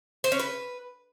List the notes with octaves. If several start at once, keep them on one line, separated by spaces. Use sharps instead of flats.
C5
C#4
B4